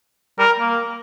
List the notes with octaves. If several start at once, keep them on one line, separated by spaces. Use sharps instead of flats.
G3 A#4
A#3